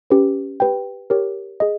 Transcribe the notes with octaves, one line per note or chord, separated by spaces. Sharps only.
C#4 G4 B4
G4 B4 G5
G4 A#4 C#5
G#4 D#5